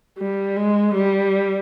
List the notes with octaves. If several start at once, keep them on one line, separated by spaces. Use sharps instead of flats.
G3
G#3
G3